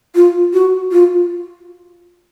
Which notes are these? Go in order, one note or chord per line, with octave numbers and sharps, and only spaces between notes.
F4
F#4
F4